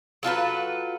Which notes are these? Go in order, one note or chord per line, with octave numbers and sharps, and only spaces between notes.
F#3 F4 A4 B4